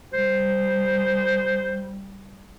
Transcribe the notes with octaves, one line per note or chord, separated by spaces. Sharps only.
G3 C5